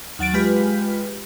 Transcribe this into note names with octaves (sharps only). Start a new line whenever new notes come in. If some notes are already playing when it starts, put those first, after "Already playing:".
D#2 F#3 A6 D7
G#3 F4 G4 B4